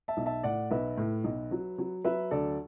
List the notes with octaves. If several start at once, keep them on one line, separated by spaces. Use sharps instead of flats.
E5 A5
B1
E5 A5
A2 D5 F#5
B1 B4 E5
A2
B1
F#3
F#3
F#3 B4 E5
D2 A4 D5